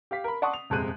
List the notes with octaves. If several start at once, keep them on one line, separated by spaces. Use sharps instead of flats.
G4 F5 B6
A#4 B5
D5 F#5 A5 C6 C#6 D#6
F7
D#1 F2 C3 G#3 F#6 D#7